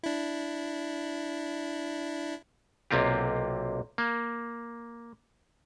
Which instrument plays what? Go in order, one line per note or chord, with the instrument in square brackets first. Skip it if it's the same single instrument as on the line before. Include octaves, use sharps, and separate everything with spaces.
[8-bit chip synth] D4 E4
[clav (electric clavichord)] B1 C3 A#3 C4 F4 G4
A#3